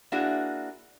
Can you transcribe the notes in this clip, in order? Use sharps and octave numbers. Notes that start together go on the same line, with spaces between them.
A#3 D4 E4 F#4 G#4